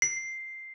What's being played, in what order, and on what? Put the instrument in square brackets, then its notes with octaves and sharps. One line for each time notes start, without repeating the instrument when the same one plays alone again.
[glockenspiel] C7